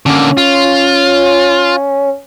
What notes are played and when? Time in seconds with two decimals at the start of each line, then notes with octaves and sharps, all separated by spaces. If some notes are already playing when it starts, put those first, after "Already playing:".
0.06 D3 A#3 C#4
0.37 F4